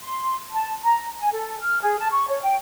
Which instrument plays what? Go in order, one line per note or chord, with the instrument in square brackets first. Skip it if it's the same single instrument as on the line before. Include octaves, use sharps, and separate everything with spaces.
[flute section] C6
A5
A#5
G#5
A4
F6
G#4
A5
C#6
C#5
G5